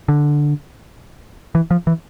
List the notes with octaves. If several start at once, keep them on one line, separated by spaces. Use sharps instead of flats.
D3
E3
F3
E3